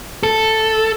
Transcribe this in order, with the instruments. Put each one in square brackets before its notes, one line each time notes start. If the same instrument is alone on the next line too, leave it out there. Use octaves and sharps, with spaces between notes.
[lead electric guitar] A4